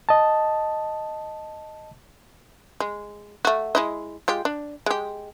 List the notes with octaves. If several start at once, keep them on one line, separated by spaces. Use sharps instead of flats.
D#5 A5
G#3
A3 F#4
G#3 E4 D#5
G#3 F4 G4
D4
G#3 G4